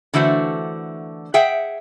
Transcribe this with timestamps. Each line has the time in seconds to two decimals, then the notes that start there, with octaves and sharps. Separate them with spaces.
0.14 D3 E3 A3 F#4 C5
1.34 G#4 E5 F#5 G5